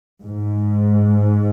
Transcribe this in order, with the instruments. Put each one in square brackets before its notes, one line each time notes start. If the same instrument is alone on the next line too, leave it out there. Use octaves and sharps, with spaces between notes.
[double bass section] G#2